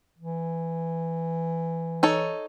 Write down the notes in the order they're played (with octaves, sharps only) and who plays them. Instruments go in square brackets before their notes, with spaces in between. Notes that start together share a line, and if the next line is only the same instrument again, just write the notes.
[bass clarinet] E3
[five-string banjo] D#4 A4 C#5